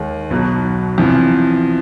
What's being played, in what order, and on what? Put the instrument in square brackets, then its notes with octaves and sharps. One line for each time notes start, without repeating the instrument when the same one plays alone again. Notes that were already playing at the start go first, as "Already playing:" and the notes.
Already playing: [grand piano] D#2 D#3 G#3
B1 B2 F#3
E2 C3 F3